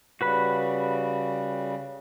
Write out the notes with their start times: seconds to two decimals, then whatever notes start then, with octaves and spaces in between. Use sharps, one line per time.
0.21 C#3 G3 F#4 B4 B5